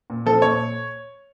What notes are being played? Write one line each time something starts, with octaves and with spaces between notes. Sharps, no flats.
A#2
F3 A4
A#2 C#5